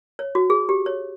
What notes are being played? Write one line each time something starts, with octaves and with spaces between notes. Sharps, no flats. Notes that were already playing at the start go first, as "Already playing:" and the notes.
C#5
F#4
G#4
G4
C#5